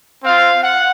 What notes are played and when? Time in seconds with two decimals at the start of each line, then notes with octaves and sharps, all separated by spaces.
0.23 C4 F4 F5
0.62 F#5